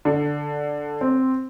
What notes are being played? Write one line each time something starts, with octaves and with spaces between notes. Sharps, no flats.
D3
C4